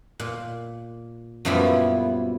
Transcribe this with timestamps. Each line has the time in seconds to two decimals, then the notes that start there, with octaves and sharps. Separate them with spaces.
0.20 A#2
1.45 F#2 A#2 F3 G3 B3 E4